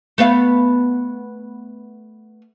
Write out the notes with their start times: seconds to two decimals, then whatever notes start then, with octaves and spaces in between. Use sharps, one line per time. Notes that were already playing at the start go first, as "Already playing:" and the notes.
0.18 A3 B3 F5